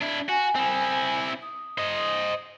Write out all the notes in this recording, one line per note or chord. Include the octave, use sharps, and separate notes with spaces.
D4 E4
F#4 G#5
C4 E4
D#6
C5 D#5